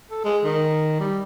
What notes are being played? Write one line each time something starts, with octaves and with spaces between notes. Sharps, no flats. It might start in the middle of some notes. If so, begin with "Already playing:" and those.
A4
G#3
D#3
G3